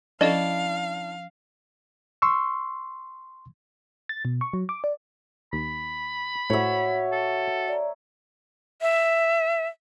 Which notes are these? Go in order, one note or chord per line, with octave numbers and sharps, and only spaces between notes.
F3 C#4 D4 E4 A4 D#5 F5
C6 C#6 E6
A6
B2
C#6
F#3
D6
D5
D#2 B5
A2 F#4 C#5 E5 F#5
A4
D5 A#5
E5